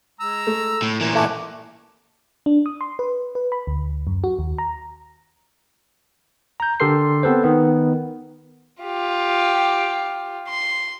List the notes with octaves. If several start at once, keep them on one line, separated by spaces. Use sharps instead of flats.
G#3 A#5 E6
A3
A2
A#2 E3 A#4
A3 F#5 G#5 D6
D4
D#6
C6
B4
B4
B5
D2
F#2
F#4
D#2
A#5
A#5 G6
D3 G4 A4 A#4 C6 C7
B3 C4 A4 B4 C5
D#3 B3
F4 G4
C6